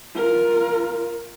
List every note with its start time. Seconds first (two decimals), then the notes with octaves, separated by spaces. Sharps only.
0.16 F4 A#4